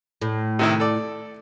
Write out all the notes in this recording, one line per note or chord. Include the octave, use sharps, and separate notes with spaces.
A2
C3 D#3 E4
A4 D5